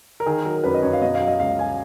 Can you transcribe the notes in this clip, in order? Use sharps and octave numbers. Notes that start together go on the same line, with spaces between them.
A#4
D#3 G#4
F#3 A#4
F#2 B4
D#5
F#2 C#5
F5
B2 D#5
F5
F#3
D#5
C#2 F5
G#5